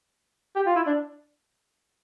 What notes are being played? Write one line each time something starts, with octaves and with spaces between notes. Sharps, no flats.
G4
F4
E4
D4